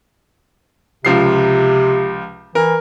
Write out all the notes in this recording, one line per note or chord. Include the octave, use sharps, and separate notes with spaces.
C#2 C3 F3 C7
E3 A#4